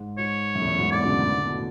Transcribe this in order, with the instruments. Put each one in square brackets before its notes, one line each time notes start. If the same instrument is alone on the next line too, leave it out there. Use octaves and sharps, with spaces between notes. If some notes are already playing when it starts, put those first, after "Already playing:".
Already playing: [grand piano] G#2
[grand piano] G#2 [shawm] C#5
[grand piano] F#2
E2
F#2
A2
G#2
[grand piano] A2 [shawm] D5
[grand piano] B2
C#3
D3
A2
E3
D3
B2
A2